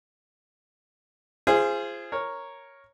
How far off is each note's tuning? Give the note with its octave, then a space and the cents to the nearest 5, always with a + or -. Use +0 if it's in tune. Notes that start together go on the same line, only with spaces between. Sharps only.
F4 -30 G#4 -5 C5 +0
A#4 +0 C#5 -5